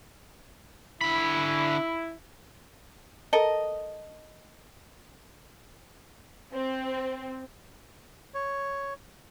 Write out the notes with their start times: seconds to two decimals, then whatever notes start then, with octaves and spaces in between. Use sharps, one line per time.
1.01 D3 E4 B5
3.33 A4 A#4 D#5
6.53 C4
8.34 C#5